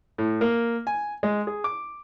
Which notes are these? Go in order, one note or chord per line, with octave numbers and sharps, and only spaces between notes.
A2
A#3
G#5
G#3
G#4
D6